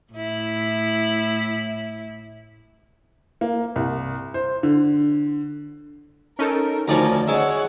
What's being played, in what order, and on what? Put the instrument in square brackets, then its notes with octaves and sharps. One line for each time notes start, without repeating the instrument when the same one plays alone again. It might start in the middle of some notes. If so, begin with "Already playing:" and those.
[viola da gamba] A2 E4
[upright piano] A#3
C2
C5
D3
[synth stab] C#4 D#4 A4 [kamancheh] A#4
[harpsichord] D2 F3 [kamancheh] C#4 [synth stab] D#4 D5 A#5
[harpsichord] G#3 E5 [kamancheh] C#5 F#5